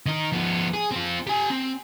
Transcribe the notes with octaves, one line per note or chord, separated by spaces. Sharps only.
D#3 D#4
F3 B3
G#4
C4 F4
G4 G#5
C4